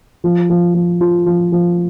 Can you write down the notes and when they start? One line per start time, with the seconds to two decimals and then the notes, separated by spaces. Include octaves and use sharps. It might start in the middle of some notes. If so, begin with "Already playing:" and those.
0.24 F3
0.50 F3
0.74 F3
1.01 F4
1.26 F3
1.52 F3